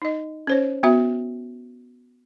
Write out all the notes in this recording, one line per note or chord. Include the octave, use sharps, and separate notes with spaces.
D#4 D#5
C#4 C5 C#5
B3 F#4 E5